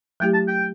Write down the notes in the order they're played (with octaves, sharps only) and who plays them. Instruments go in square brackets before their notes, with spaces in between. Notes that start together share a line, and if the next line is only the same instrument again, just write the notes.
[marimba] F#3 A3 E4 G4 [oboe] G5
[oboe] A5
G5